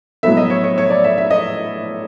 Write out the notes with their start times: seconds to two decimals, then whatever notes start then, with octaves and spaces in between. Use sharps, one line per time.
0.23 A2 F#3 B3 E5
0.37 D#5
0.50 C#5
0.64 C#5
0.78 C#5
0.90 D5
1.04 E5
1.18 E5
1.31 D#5